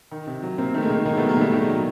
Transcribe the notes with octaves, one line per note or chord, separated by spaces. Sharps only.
D#3
C3
F#3
C3 A#3 C4
D#3 A3
G#3 A#3
D#3
D#3 G#3 A#3
A3 B3
F#3
G#3 A#3
D#3 G3 A3
D#3 G#3
F#3